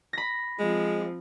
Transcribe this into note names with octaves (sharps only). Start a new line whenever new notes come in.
B5 A#6
F3 G#3 C4